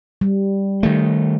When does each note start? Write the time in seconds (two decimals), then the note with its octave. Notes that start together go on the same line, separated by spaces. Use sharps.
0.21 G3
0.83 D#3 A3